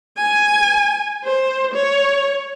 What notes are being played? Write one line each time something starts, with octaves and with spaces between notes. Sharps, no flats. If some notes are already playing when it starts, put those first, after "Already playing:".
G#5
C5
C#5